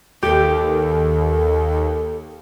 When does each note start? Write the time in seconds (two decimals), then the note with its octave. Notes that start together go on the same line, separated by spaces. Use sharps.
0.23 D#2 G4 A4